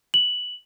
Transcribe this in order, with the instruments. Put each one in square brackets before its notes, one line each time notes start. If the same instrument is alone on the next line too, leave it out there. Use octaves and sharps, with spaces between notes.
[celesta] F#7